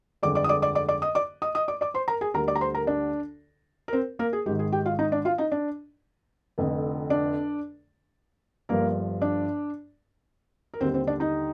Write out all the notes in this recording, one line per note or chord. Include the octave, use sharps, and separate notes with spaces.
G1 F2 D3 G#3 D5 D6
D5 D6
D#6
D5 D6
D5 D6
D5 D6
D5 D6
D#5 D#6
D5 D6
D#5 D#6
D#5 D#6
D5 D6
D5 D6
C5 C6
A#4 A#5
G#4 G#5
D2 D3 G3 A#4 A#5
D5 D6
A#5
C5 C6
A#4 A#5
D4 D5
A#4
C4 C5
A#3 A#4
G#4
G#1 G#2 D#3 G4
G#4
G4 G5
F4 F5
D#4 D#5
D4 D5
F4 F5
D#4 D#5
D4 D5
F1 F2 D3
D4 D5
G1 G2 F3 A#3 A#4
D4 D5
A#4
D#2 D3 G3 C4 C5
C4 C5
D4 D5
D#4 D#5